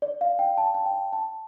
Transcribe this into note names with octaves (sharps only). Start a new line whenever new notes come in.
D5
F5
G5
A5
A5
G5
A5